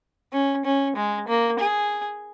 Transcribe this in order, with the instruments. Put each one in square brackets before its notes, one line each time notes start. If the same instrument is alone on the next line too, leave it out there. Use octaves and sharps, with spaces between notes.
[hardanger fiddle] C#4
C#4
G#3
A#3
G#4